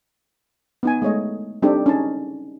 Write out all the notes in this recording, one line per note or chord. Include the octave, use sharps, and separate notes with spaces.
B3 D#4 G#5
G#3 A3 C#5 D#5
G3 C4 D4 D#4 G4 A4
C#4 D#4 A5